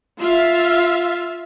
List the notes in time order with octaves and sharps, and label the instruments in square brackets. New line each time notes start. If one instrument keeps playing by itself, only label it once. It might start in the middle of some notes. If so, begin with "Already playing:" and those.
[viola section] F4 E5 F5